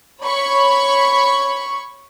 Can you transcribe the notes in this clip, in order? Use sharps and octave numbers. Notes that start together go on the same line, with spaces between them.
C#5 B5 C#6